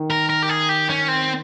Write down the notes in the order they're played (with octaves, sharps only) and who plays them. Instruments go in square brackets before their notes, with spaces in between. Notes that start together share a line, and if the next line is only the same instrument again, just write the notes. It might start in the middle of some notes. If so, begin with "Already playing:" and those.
Already playing: [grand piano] D#3
[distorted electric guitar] A#4
A#4
G4
G#4
G4
C#4
C4